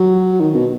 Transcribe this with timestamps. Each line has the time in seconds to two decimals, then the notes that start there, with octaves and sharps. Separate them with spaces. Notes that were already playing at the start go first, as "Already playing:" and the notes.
Already playing: F#3
0.40 D#3
0.55 B2